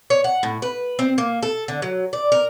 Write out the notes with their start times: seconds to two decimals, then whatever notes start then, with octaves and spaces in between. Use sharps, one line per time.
0.10 C#5
0.24 F#5
0.43 A2
0.62 B4
0.99 C4
1.18 A#3
1.43 A4
1.68 D3
1.82 F#3
2.13 D5
2.32 A#4